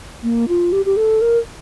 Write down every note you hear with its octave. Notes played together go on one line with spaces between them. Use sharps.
A#3
F4
G4
G4
A4
A#4